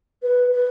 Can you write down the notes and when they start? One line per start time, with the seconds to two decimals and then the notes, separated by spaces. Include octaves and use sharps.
0.22 B4
0.51 B4